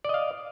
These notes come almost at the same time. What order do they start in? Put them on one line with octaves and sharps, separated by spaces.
D5 D#5 F5